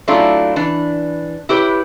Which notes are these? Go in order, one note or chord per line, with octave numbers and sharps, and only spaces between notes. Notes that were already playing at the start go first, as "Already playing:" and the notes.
F#3 A3 D4 E4 F4
E3 D4
E4 G4 B4 C#5